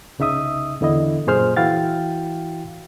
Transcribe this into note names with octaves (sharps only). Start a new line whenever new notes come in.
C2 C#3 D#4 E5 D#6
E2 D3 E4 D#5
F#2 A#2 G#4 C5 F6
E3 E4 F#4 F5 G5 A6